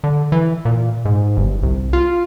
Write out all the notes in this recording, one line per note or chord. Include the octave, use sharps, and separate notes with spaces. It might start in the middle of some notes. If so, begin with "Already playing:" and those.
D3
E3
A#2
G#2
G1
C2
F4